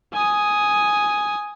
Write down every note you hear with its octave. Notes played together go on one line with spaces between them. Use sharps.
G#5 D#6